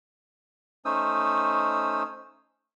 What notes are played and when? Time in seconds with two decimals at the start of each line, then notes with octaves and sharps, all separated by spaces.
0.85 A3 C#4 D#4 C5 D#6 E6